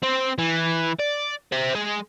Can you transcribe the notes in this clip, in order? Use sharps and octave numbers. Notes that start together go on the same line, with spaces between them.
C4
E3
D5
C5 E5
G#3